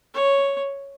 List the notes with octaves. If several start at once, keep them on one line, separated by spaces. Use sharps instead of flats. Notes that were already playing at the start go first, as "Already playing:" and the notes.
C#5